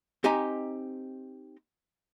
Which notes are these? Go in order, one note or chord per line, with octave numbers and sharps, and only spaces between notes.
C4 D#4 G4 D#5 G#5 A#5